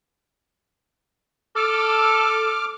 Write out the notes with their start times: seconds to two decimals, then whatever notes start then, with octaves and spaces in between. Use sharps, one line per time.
1.56 A4 D6 F6